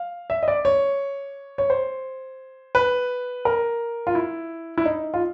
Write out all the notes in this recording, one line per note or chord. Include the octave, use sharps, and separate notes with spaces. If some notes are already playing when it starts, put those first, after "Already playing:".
Already playing: F5
E5
D#5
D5
C#5
C#5
C5
B4
A#4
F4
E4
E4
D#4
F4